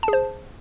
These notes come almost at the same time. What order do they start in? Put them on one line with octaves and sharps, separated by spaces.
A5 G#4 C5